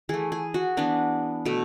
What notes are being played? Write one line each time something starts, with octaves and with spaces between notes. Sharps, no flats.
E3 A3 G#4
G#4
F#4
E3 B3 D4
B2 A3